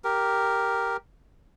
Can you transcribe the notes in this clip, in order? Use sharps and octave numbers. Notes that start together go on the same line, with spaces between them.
G4 A#4